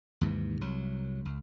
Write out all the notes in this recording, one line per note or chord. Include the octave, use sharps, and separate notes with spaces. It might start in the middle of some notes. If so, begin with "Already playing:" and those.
D#2 G#2 C3 E3
C2 F#3
C#2